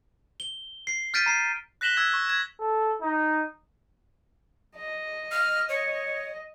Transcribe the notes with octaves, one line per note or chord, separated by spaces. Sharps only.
G7
C7
F6 G6 A6 B6 D7 D#7
A#5 C7
F#6 A#6 B6 E7 F#7 G7
E6 G#6
C#6
G#6
A4
D#4
D#5
F6
C#5